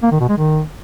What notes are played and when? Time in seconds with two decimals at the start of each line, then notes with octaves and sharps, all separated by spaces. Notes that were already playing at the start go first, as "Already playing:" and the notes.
0.03 A#3
0.11 D#3
0.20 B2
0.29 G#3
0.37 D#3